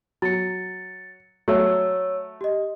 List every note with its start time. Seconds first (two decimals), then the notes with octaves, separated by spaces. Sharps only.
0.22 F#3 A6 C#7
1.48 F#3 A3 C#5 E6
2.41 G4 D#5